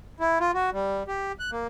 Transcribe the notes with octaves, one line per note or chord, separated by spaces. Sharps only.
E4
F4
F#4
G3
G4
F#6
A#3